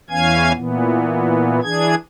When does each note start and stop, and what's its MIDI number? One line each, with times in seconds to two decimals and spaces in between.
0.10 0.52 40
0.10 0.52 52
0.10 0.52 61
0.10 0.52 77
0.10 0.52 80
0.10 0.52 92
0.55 1.60 46
0.55 1.60 52
0.55 1.60 59
1.63 1.95 52
1.63 1.95 62
1.63 1.95 68
1.63 1.95 92